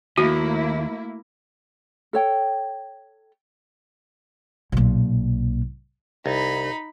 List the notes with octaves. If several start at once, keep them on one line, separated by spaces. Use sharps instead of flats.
D#2 A3 A#3 E4 F#4
A4 C#5 G5
B1 A#2
C2 D#4 B5